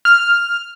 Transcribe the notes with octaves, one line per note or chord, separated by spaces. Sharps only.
F6